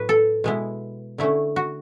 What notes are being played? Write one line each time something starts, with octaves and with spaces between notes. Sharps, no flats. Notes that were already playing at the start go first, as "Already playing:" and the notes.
Already playing: A2 F#3 B4
A4
B2 G#3 B3 E4
D3 A3 C#4 E4
F#4